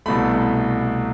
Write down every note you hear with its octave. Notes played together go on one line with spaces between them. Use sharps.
C2 B2 A3 B5